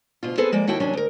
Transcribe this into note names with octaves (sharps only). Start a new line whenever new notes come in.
D2 B2 F4
B3 C4 G#4 A4 B4
F3 G#3 A#3 D5
D#2 E4 F#4 G5 A5
D#2 C3 F#3 C#4 D4 G#5
D2 A#4